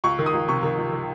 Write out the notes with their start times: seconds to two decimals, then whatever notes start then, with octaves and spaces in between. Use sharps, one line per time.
0.04 C#2 C#6
0.19 D#3
0.26 D#6
0.34 C#2
0.48 C3 C#6
0.63 D#3
0.78 C#2
0.93 D#3